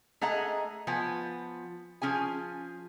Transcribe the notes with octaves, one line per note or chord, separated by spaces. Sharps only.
A3 G#4 D#5 F#5 A#5
F3 B3 G#5
F3 C#4 G#4 G#5